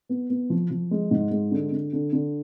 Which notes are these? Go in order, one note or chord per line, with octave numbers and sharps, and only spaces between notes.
B3
B3
F3
F3
G#3
G#2
G#3
D3
D3
D3
D3